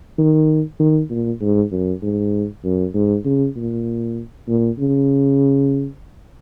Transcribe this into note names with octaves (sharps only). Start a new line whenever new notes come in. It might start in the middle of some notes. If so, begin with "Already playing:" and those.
D#3
D#3
A#2
G#2
F#2
G#2
F#2
G#2
C#3
A#2
A#2
C#3